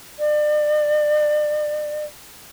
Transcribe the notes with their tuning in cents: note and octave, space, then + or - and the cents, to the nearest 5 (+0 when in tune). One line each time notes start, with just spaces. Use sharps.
D5 +35